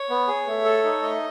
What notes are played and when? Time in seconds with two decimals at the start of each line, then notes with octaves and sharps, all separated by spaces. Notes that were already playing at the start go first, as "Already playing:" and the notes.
Already playing: C#5
0.10 B3
0.28 G#4
0.47 A3
0.64 A4
0.84 D#4
1.02 A3 D#5